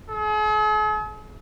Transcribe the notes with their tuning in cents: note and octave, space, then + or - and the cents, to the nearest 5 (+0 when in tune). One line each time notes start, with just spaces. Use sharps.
G#4 +45